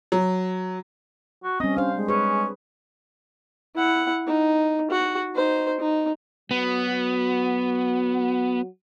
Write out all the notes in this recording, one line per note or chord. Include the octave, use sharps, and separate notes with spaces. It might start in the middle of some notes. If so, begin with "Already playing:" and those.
F#3
F#4
G3 C4 C#4 D#5
D4 C5 F5
G#3
C#4 G#4 B4
E4 F#5
D#4
F#4
D#4 C5
D#4
F#3 B3 F#4